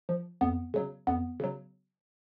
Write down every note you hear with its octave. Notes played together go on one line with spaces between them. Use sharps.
F3
F2 B3
C#3 F#3
F2 B3
C#3 F#3